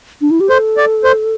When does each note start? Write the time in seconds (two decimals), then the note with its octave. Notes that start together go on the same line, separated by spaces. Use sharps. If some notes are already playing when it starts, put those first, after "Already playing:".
0.21 D4
0.31 E4
0.40 G4
0.49 A4 C5
0.77 D5
1.04 C5